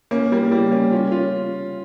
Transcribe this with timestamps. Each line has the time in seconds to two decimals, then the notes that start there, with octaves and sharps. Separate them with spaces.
0.11 A#3 C#4
0.32 G3 A#3
0.51 G3 A#3
0.71 A#3 C#4
0.91 C#4 F4
1.12 C#4 F4